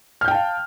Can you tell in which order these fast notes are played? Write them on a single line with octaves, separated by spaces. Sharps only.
F6 G6 G5 A5 F5